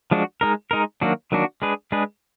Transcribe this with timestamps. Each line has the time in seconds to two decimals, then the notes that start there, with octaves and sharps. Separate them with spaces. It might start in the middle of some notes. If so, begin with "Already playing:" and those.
0.11 F3 G#3 D4 F#4
0.41 G#3 D#4 A#4
0.71 G#3 D#4 A#4
1.01 D#3 F#3 A#3 D4 F#4
1.32 D#3 F#3 A#3 D4 F#4
1.62 G#3 D4 G#4 B4
1.92 G#3 D4 G#4 B4